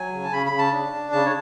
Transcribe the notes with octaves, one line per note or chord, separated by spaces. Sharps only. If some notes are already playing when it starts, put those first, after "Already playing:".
Already playing: F#3 G#5
C#3
A5
C#3 B5
B5
C#3
A5
D4
D4
C#3 A5
C#5